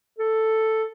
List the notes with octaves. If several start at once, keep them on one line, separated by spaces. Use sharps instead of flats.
A4